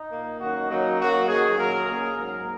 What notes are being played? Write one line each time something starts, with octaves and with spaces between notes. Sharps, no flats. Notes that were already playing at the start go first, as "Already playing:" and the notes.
Already playing: D#4
A#2 A#3
F#2 D#3 A#3 F#4
C#3 F#3 A#3 D#4
F#2 F#3 A#3 F#4
F#2 D#3 F#3 G#4
A#2 F#3 A#3 A#4
C#3 A#3 G#4
G#2 F#3 A#3 A#4